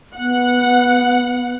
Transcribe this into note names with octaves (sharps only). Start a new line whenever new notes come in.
B3 F#5